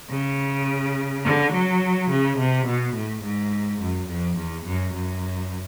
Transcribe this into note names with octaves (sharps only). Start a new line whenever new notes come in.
C#3
D3
F#3
C#3
C3
B2
A2
G#2
F#2
F2
E2
F#2
F#2